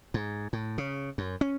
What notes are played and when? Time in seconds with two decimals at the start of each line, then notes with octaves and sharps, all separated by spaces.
0.14 G#2
0.53 A2
0.78 C#3
1.18 F#2
1.41 C#4